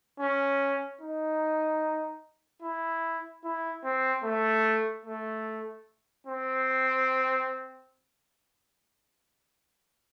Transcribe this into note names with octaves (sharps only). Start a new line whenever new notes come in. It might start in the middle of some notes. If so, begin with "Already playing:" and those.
C#4
D#4
E4
E4
C4
A3
A3
C4